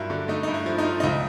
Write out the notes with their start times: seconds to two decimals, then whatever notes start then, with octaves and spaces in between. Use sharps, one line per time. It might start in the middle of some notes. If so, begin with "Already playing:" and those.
Already playing: G2 F#3 A#3 E4 F4
0.10 D3
0.28 A3 D#4
0.43 G2 D#4
0.54 E4
0.66 F3
0.78 D#4
0.85 F3
1.00 D#4
1.04 C#2 E4